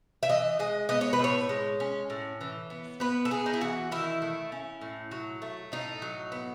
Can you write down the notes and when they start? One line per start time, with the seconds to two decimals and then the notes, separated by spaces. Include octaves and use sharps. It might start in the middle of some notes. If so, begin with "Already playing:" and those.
0.23 E5
0.29 E3 D#5
0.59 G#3 D#5
0.89 B3 D#5
1.01 C#5
1.13 B4
1.19 A2 C#5
1.49 G#3
1.80 C#4
2.10 A2
2.41 E3
2.70 B3
3.00 B3 B4
3.25 A4
3.31 B3 G#4
3.46 D#4
3.54 E4
3.61 E3 F#4
3.92 D#3 E4
4.22 A3
4.52 C#4
4.81 A2
5.11 F#3
5.42 A3
5.72 A2 D#4
6.02 F#3
6.32 B3